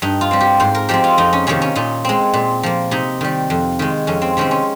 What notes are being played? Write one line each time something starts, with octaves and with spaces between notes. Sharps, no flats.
G2 D#4
F4
G3 C4
G4
G#2 C5
A#4
F3 G#3 C4 G4
F4
F2 D#4
C#4
C3 D#3 A#3 C#4
C#4
A#2 D#4
G#3 C4
A#2
F3 A#3
C3 D#4
D#3 G3
F2
D#3 G#3
F2 C#4
C4
C3 D#3 G#3 C4 C#4
C#4